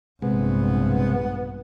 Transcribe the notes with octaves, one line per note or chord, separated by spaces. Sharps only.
A#1 G2 C3 G#3 B3